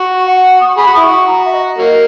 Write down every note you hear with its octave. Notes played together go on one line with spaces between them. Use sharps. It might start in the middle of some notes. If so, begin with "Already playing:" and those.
Already playing: F#4 C#6
F#5
D#6
C#6
G#4 B5
F#4
E4 D#6
F#4 C#6
A#5
E5
D#5
F#3 A#3